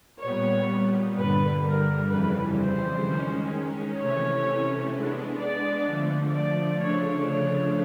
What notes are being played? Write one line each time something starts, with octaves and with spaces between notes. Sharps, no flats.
A#2 G3 B3 C#5
G2 D3 G3 B4
A#4
F2 C#3 E3 G3 B4
C5
D#3 G#3 C#4
C3 E3 A3 C#4 C#5
G#3 B3 D4
D5
D3 F3 A3
D5
C#3 F3 A3 D4 C#5
C#5